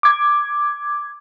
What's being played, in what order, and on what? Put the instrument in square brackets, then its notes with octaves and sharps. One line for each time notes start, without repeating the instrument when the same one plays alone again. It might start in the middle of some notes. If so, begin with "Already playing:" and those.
[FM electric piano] D6 G#6